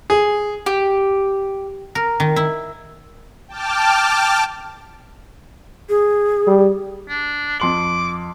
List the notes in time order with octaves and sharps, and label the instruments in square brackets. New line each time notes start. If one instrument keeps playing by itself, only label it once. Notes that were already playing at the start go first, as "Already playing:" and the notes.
[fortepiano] G#4
[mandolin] G4
[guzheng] A#4
D#3
E4
[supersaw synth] G5 A5 D6 F6
[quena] G#4
[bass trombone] G3
[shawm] D4
[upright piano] F2 C6 F#7 [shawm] D6